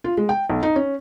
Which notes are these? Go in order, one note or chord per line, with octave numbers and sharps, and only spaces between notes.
F4
G#3
G5
B1
D#4
C#4